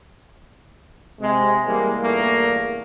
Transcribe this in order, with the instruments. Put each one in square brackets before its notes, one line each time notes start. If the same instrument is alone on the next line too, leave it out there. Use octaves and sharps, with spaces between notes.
[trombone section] C3 G#3
E3 G3 G#3 A#3
E2 G2 A#2 A3 A#3